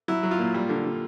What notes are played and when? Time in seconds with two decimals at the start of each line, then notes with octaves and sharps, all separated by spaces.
0.08 F#3 E4
0.23 F#3
0.31 F4
0.39 A#2
0.54 G3
0.69 D3
0.85 D3